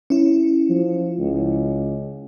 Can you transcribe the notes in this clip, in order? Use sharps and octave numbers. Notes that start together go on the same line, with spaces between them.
C#4 E4
F3
C#2